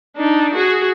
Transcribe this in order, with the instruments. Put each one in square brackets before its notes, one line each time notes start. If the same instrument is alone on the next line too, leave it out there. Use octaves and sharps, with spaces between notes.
[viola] D4 D#4
F#4 G#4